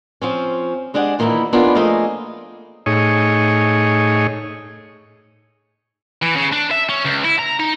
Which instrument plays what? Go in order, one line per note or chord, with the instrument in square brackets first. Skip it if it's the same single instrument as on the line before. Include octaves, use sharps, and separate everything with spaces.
[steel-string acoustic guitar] F3 C4 C#4
G#3 D4 G4 G#4 F#5
A#2 D#3 E3 A3 A#3 E4
B3 D4 D#4 F4 G#4 A#4
F3 A3 A#3 G#4 D#5 F5
[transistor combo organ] A2 D#4 G#4 C#5
[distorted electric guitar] E3
C#3
D4
E5
C#4
C#2
E4
A#5
D#4